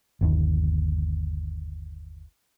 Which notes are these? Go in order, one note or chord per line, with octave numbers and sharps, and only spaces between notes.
G1 D#2